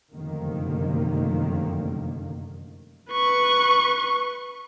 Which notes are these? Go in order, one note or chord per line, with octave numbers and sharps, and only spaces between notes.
F1 F#2 D3 D#3 A#3
B4 C#6